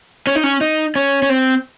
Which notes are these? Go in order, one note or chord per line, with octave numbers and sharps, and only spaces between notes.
C#4
D#4
C#4
D#4
C#4
C#4
C4